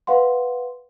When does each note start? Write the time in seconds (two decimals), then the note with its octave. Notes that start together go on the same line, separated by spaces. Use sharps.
0.07 B4 F5 F#5 C6